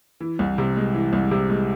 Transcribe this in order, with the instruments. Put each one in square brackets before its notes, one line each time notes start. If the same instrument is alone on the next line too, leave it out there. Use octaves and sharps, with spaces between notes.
[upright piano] E3
C2
C3
G#3
E3
C2
C3
G#3